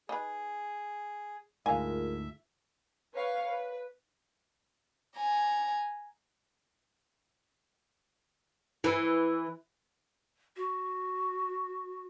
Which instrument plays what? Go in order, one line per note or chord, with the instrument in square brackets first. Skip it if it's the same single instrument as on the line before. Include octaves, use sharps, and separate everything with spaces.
[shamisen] D#4 B4 [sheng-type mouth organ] G#4
[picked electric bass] D2 G#2 [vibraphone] F4 G#4 A#4 [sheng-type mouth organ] E5 [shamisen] F5 G#5
[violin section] B4 C#5 F5
B4
[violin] G#5 A#5
[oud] E3
[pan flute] F#4